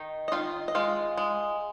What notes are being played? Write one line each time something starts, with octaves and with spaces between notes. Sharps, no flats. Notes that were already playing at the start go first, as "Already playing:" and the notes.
Already playing: D#3 D#4
D#5
D#3 F4 F5
D#5
G#3 F4 F5
G#3